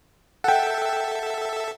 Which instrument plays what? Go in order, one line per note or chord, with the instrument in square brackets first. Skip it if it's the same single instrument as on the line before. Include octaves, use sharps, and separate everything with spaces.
[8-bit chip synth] A4 E5 [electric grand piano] F#5 G5